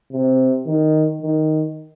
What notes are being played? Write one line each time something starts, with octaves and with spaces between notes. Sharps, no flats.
C3
D#3
D#3